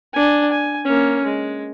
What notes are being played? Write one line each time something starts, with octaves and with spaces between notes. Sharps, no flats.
D4 G#5
G#5
A#3 C#4
G#3